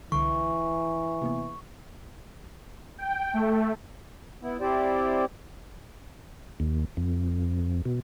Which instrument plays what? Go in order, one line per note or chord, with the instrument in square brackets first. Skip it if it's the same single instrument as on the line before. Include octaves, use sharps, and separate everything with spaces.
[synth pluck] C2 D3 [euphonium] E3 [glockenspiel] C#6
[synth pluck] C3 A#3 B3
[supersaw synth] G5
A3
[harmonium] B3 E4
C4 E4 G4 C5 D5
[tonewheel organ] D#2
F2
B2